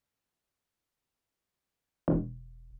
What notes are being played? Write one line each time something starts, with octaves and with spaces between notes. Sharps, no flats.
E1